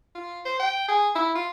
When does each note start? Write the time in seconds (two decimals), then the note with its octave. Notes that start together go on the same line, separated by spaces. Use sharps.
0.15 F4
0.45 C5
0.60 G5
0.88 G#4
1.15 E4
1.35 F4